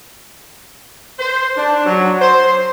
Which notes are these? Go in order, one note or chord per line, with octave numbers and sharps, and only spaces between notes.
C5
D4
F#3
C5